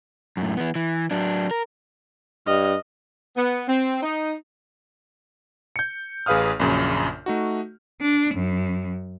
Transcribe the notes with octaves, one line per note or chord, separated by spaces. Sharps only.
F#2 A2
E3 B3
E3
F#3 D4
A#4
G2 D#5 F6
B3
C4
D#4
G6 C#7
A1 G#4 B4 F5 D#6 F6
A#1 F#2 C#3
A3 D#4 F#4
D4
F#2